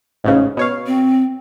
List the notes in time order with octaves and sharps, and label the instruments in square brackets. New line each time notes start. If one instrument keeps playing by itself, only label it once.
[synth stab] A1 G#2 C#3
B2 C#5 F5
[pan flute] C4